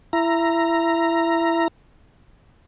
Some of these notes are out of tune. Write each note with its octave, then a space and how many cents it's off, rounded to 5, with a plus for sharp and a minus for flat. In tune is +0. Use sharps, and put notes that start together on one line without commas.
E4 +20 A#5 +0